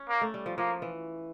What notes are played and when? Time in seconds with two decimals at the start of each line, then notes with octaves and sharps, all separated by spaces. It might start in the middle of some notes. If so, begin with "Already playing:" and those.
Already playing: C#4
0.09 A#3
0.21 A3
0.34 G3
0.46 F3
0.58 F3 A#3
0.82 E3